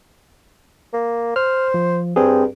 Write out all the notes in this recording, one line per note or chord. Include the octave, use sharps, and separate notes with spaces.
A#3
C5 F6
F3
G2 C4 G#4